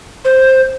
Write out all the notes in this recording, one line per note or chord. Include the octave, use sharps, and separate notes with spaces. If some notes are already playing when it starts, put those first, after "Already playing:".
C5